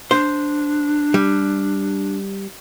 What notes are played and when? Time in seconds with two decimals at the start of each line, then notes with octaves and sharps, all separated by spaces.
0.11 D4 C5
1.14 G3